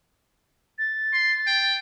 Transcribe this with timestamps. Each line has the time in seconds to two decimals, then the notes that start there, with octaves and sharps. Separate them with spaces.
0.78 A6
1.13 C6
1.47 G5